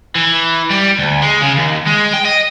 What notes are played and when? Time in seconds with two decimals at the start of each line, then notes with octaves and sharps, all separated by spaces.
0.15 E3
0.70 G3
0.99 D2
1.22 G#3
1.41 C#3
1.56 D#2
1.86 G#3
2.13 G5
2.25 D#5